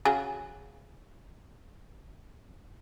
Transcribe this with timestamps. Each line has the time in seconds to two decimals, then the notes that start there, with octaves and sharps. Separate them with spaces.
0.05 C#3 F#4 G#4